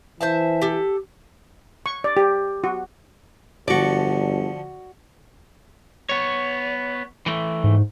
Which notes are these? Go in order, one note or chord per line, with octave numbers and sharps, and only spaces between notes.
E3 C5 E5 A5
G4 A4
C#6
D5
G4
F#4
G1 D3 F3 F#4 D5 C#6
B3 C#5
E3 A3
G#2